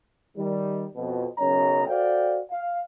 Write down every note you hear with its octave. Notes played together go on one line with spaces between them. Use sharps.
D#3 G3
F2 B2
B1 F#2 C#3 C#5 D#5 A#5
F#4 A4 C5 D5 F5 G5
F5